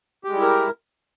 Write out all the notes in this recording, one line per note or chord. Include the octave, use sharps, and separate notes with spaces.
G3 G#3 E4 G4 A#4